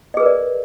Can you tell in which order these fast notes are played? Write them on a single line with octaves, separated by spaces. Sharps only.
D#5 G#4 B4 A#4 D5